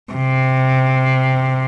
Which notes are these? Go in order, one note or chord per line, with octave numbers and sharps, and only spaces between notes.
C3